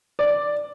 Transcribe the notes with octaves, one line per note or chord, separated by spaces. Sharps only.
D5